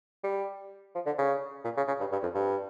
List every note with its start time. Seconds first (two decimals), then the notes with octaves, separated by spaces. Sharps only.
0.24 G3
0.95 F3
1.06 D3
1.18 C#3
1.64 A#2
1.77 C#3
1.88 C#3
2.00 G2
2.12 G2
2.23 F2
2.35 G2